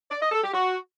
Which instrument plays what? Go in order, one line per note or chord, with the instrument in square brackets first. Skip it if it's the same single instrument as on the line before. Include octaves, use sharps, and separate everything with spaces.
[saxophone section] D5
D#5
A4
G4
F#4